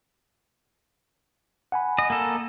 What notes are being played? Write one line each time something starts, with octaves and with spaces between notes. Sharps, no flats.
F#5 G#5 B5
D#5
A#3 A4